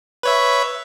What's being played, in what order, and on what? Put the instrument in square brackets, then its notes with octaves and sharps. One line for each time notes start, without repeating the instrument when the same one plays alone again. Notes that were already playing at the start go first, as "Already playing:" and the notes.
[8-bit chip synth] B4 C#5 E5